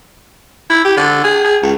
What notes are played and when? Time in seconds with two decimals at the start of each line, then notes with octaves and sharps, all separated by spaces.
0.70 E4
0.85 G4
0.97 D3
1.24 G#4
1.44 G#4
1.63 C#2